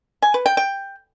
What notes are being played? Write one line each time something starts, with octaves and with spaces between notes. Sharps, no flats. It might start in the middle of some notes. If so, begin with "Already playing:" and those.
G#5
B4
G5
G5